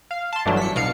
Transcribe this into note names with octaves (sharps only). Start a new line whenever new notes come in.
F5
A5 C6
G1 E3 F#3 A3 D4
B6 C#7
C2 B2 F5 C#7